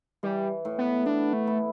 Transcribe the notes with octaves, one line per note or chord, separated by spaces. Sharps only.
E3 G3
A2
B3
B3 D4
A3
E4